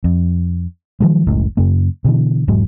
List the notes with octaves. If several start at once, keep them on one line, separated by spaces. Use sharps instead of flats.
F2
D#3 F3 F#3 G#3
F#1 C#2 A2
F#2 C#3 A#3
B2 D3 E3
E1 G#2 F#3